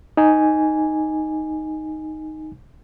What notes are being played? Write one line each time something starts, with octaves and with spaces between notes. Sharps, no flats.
D#4 G#5